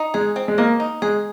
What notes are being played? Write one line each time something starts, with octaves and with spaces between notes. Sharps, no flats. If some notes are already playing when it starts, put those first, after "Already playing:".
Already playing: D#4
G#3 G#4
C4
G#3
A#3 D#5
D#4
G#3 G#4